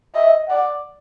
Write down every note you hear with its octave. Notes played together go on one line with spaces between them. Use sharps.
D#5 E5
D5 F#5